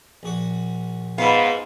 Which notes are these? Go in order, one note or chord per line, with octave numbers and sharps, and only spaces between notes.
A#1 F#4
G#2 B3 F4 B4 E5 F5